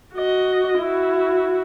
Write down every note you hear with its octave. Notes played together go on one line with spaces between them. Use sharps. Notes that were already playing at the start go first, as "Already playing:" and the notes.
F#4 D#5
E4 F#4